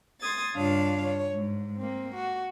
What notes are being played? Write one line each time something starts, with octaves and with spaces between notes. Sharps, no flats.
C6 D#6 G#6 A6
G2 C#3 D4 F4 C#5 F5
C#5
G#2
A#3 C4
F#4